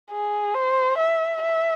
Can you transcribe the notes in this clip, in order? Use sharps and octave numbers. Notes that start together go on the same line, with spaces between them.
G#4
C5
E5
E5